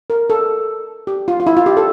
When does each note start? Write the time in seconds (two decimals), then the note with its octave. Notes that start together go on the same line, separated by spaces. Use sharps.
0.10 A#4
0.30 A4
1.07 G4
1.28 F4
1.40 F4
1.47 E4
1.57 F4
1.66 G4
1.77 A4